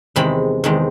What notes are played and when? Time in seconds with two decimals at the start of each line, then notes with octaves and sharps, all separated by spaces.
0.16 E2 C3 D#3 G#3 B5
0.64 E2 C3 D#3 G#3